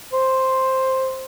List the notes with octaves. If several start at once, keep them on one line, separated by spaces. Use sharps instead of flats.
C5